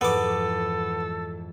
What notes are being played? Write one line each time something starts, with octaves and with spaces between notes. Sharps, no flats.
F2 G#2 E3 B3 A4 D6